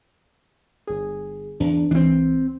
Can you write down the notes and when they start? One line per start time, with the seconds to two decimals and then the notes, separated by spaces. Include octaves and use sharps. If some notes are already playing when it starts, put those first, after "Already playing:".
0.87 G1 G#4
1.60 E2 D4
1.91 C#2 E3 C4 D4